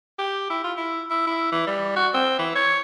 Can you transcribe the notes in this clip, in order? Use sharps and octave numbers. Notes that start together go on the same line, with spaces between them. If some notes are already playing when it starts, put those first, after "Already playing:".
G4
E4
F4
E4
E4
E4
E3
G3
F#4
C4
E3
C#5